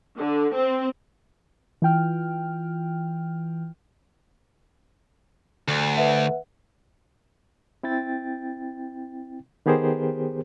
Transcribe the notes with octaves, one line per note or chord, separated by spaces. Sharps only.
D3
C4
E3 F4 G5 F6
D2
B4 E5 F#5
C4 E4 G5 A6
D#3 B3 G4 G#4 A#4 C5